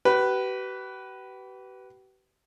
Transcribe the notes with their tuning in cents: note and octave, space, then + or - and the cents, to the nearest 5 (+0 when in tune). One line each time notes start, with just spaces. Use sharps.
G4 -45 B4 +0